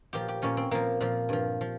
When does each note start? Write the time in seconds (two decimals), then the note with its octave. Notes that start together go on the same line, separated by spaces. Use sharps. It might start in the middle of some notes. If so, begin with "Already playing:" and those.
0.13 A#2 F3 G4
0.28 G4
0.42 A#2 F3 C#4
0.57 C4
0.71 A#2 F3 A#3
1.00 A#2 F3
1.29 G2 F3
1.61 F3